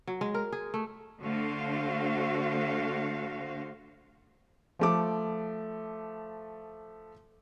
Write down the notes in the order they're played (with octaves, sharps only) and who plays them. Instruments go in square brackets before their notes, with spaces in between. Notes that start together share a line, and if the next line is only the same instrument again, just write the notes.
[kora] F#3
G#3
A#4
G#4
A3
[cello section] D3 A3 F#4 C5 F5
[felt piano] F3 A3 D6